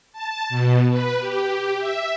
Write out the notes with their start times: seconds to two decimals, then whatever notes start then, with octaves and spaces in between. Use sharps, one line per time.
0.13 A5
0.49 B2
0.89 B4
1.19 G4
1.78 E5